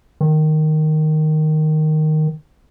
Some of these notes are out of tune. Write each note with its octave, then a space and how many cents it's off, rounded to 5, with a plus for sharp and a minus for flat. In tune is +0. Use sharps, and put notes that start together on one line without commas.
D#3 -5